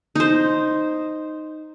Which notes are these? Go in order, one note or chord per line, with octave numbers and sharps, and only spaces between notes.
D#4 C5